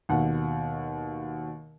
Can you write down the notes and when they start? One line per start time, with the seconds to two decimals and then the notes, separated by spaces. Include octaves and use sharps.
0.09 D#2 B2 F#5